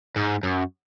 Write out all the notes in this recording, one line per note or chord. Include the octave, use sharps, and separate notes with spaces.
G#2
F#2